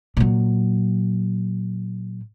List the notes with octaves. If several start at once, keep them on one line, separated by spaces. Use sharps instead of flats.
A#2 F#3